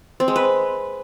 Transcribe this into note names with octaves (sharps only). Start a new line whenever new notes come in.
C4
G#3
B4